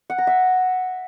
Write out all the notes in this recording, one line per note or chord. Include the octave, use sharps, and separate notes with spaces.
F#5
A#5
E5